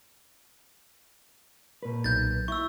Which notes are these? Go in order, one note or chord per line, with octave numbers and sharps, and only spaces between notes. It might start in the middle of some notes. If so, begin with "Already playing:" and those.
A#2 B4
B1 G6 A6
E4 C#6 E6